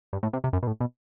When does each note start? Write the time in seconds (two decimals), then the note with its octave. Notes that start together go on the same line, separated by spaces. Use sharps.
0.13 G2
0.23 A2
0.33 C3
0.44 C3
0.53 F#2
0.63 B2
0.67 A2
0.80 B2